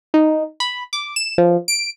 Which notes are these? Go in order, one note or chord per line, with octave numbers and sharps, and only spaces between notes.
D#4
B5
D6
E7
F3
D7